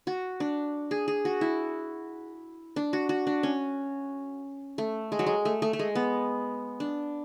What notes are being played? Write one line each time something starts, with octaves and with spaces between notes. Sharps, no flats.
F#4
D4
G#4
G#4
F#4
E4
D4
F#4
F#4
D4
C#4
A3
G#3
F#3
G#3
A3
A3
A3
G#3
B3
D4